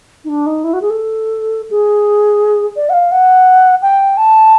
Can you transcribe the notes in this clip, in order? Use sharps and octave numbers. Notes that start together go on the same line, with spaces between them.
D#4
D4
D#4
E4
F#4
G#4
A4
G#4
D5
F#5
F5
F#5
G5
A5